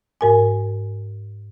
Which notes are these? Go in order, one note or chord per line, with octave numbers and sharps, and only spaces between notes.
G#2 A#4 G#5